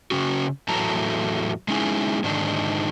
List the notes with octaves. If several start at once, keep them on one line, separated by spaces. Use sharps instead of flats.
C#3 C#4 F#4
E2 A2 F#3 A3 A5 A#5
G#3 A3 C#4 D#4 E4 G#4
G#2 D3 D#3 D4 D#4